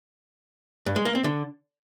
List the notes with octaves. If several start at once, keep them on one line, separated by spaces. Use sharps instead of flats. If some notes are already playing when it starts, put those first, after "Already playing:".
G2
G#3
A#3
C4
D3